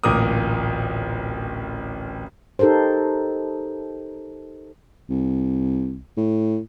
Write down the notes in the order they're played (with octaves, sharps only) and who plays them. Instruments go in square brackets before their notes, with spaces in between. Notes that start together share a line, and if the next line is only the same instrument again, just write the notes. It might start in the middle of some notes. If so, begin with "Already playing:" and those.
[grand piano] D1 A1 A#2 A#4 D6 D#6
[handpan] D#4 G4 A4 A#4 C5
[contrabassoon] C2
A2